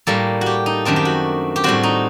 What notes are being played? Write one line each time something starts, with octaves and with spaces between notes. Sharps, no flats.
A2 G3 A#3 A4
F#4
G4
D#4
F#2 D#3 A3 C4 D4
G4
F#4
G4
A2 G3 C4 F#4
D#4